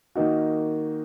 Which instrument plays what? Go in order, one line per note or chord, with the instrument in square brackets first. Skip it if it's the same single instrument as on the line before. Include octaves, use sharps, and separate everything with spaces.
[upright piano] D#3 A#3 D#4 F#4